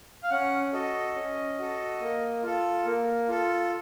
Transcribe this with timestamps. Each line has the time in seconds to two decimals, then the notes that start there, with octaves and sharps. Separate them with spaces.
0.23 F5
0.30 C#4 F#5
0.73 F#4 A4 D#5
1.16 C#4
1.58 F#4 A4
2.00 A#3
2.43 F4 A4
2.85 A#3
3.28 F4 A4